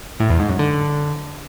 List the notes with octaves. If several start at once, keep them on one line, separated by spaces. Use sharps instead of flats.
A2
E2
G#2
F#2
D3